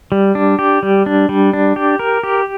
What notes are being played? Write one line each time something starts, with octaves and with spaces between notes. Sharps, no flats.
G3
D4
G4
G3
D4
G3
D4
G4
A#4
G4